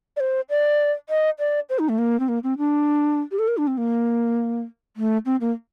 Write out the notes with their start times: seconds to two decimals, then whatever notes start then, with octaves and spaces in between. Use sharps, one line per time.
0.17 D5
0.20 C5
0.50 D5
1.09 D#5
1.39 D5
1.69 C5
1.79 D#4
1.89 A3
1.98 A#3
2.20 C4
2.28 A#3
2.43 C4
2.58 D4
3.31 G4
3.39 A4
3.48 A#4
3.57 D4
3.67 C4
3.77 A#3
4.97 A3
5.26 C4
5.41 A#3